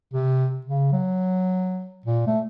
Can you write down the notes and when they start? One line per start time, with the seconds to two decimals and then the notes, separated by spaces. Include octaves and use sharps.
0.13 C3
0.66 C#3
0.93 F#3
2.06 A#2
2.27 A3